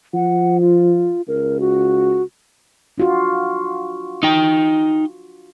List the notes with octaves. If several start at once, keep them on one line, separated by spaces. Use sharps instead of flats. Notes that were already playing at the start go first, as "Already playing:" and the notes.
F3 F#5
F4
C#2 A#4
F#4
D4 F4 F#4
D#4 G5